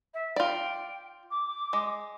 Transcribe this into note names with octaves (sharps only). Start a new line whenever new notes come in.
E5
F4 D5 G5
D6
G#3